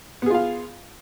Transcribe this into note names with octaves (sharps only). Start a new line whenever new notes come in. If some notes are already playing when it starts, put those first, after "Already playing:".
B3 F4 G#4 F5